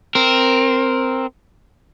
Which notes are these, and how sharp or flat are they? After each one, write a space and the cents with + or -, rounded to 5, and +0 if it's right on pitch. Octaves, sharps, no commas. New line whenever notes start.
C4 +0 A#4 +0